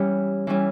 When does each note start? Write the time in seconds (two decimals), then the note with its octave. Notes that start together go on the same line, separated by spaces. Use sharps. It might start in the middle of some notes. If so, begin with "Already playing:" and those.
Already playing: E3 G3 C#4
0.47 E3 G3 C#4